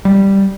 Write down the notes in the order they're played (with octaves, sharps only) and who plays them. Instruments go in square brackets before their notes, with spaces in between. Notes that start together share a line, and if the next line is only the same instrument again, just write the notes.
[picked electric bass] G3